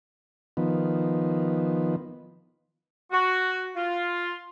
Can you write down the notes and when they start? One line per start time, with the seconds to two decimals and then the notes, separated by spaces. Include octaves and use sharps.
0.57 D#3 F3 B3
3.12 F#4
3.76 F4